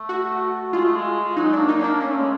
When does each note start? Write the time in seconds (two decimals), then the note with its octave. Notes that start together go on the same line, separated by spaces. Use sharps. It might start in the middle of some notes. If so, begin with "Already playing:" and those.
Already playing: A3
0.09 F#4
0.73 G#3 F4
0.85 A3
0.96 G#3
1.37 F#3 D#4
1.53 D4
1.58 A#3
1.69 D#4
1.79 A#3 C#4 D4
2.00 A#3 C#4
2.10 A3
2.20 G#3